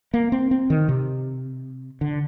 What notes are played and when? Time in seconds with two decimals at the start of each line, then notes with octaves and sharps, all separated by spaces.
0.14 A#3
0.32 C4
0.51 C4
0.70 D#3
0.88 C3
2.01 D3